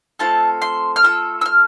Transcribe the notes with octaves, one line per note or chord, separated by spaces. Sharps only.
A3 C4 F4 A4 A5
C6
F6
A3 C4 F4 A4 E6
E6
F6